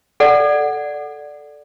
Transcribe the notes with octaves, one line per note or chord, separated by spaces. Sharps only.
A4 D5 F#5